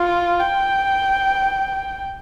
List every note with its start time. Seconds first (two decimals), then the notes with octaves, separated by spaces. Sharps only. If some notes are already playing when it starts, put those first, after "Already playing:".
Already playing: F4
0.40 G5